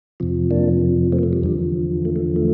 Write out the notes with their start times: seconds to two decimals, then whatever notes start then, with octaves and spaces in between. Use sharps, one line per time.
0.20 F2 C3 F3
0.51 A#3 D4
1.12 A3 C4
1.19 A#3
1.23 A3
1.33 G3
1.43 E2 D3 F3
2.05 A3
2.16 A3
2.36 A3